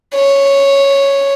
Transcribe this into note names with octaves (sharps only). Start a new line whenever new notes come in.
C#5